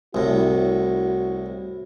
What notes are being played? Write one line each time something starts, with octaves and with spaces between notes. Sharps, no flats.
C2 A2 F#4